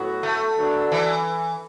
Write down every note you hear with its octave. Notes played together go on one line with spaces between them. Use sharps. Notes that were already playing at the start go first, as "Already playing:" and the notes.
Already playing: A2 F#3 B3 F#4 A4
A3
D3 F#3 B3 D4
E3